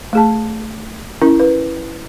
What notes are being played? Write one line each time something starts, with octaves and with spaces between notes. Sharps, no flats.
A3 G#4 A5
C#4 E4 A#4
B4